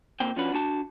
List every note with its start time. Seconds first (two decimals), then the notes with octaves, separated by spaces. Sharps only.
0.20 A#2 A#3 C4 G5
0.36 F3 C#4 D4 F4 F#4 B4
0.54 D4 F#4 A5